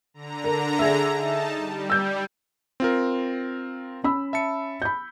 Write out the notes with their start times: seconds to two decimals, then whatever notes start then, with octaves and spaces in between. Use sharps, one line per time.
0.14 D3 A#5
0.44 A#4
0.79 G#4 E5
1.16 D#4 A5
1.56 G3
1.90 E6 G6
2.80 C4 F4 A#4
4.04 C#4 B5 E6
4.33 E5 A5 C#7
4.82 B5 G6